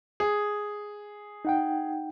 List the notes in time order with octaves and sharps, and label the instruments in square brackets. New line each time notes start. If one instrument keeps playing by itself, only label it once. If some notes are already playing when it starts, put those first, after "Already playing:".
[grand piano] G#4
[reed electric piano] D#4 F#5 G5